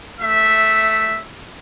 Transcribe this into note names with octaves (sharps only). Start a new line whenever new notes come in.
A3 E5